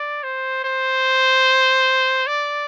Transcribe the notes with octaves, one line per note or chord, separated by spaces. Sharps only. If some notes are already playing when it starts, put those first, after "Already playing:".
Already playing: D5
C5
C5
D5